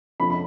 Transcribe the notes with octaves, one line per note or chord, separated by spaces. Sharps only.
F2 D3 F3 B5
B5